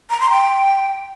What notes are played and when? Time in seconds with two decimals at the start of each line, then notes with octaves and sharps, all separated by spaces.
0.10 A#5
0.20 C6
0.31 G5